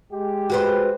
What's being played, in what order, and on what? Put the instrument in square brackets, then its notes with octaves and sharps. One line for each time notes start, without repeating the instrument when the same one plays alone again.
[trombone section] G#3 G4
[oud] F#4 B4 C5